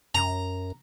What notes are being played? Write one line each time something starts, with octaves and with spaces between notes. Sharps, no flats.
F#2 A#5